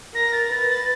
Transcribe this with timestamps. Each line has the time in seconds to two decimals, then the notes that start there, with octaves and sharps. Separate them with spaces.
0.14 A#4 A#6
0.33 A6
0.51 B4 A6
0.69 A6